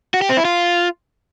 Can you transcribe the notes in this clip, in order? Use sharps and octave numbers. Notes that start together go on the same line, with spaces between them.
F#4
G4
C4
E4
F4